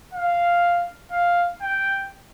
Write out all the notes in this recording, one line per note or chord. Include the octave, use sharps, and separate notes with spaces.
F5
F5
G5